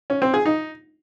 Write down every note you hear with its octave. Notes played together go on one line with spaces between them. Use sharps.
C#4
C4
G#4
D#4